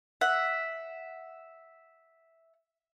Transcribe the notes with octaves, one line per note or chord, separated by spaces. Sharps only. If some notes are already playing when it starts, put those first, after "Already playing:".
E5 F#5